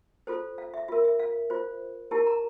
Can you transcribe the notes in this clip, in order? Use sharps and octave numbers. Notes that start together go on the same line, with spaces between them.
F4 A4 C5
F5
E5
F4 A#4 E5
E5
F5
F4 C5
E4 G4 A#4 A5
A#5